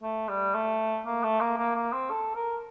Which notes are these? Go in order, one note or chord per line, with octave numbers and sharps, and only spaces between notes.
A3
G3
A3
A#3
A3
A#3
A#3
A#3
C4
A4
A#4